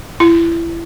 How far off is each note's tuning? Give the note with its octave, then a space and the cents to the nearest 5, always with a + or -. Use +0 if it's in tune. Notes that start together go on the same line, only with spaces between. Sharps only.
E4 +25